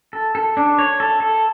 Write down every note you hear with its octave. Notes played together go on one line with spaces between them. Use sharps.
A4
A4
D4
C#5
A4
A4